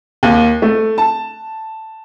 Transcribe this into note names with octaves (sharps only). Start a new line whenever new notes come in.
D#2
A3
A5